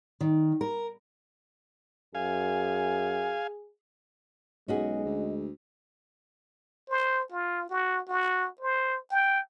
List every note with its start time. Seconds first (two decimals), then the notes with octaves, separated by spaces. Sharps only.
0.21 D#3
0.61 A#4
2.15 F#2 G#4 F5 G#5
4.68 B1 G#3 C#4 F#4 G#4 D#5
5.05 D2
6.89 C5
7.31 F4
7.70 F#4
8.08 F#4
8.61 C5
9.11 G5